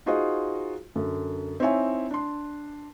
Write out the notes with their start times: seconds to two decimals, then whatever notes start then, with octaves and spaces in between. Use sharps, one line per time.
0.06 D#4 F4 F#4 G#4 C5 D#5
0.95 F#2 D3
1.60 C4 D#4 E4 C#5 E5 G#5
2.11 D4 C6